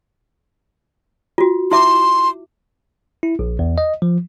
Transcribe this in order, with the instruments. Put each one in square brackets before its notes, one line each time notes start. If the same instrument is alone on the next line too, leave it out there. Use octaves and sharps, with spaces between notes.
[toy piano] F4 F#4
[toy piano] E4 E5 D6 [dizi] C6
[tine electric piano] E4
A#1
E2
D#5
F3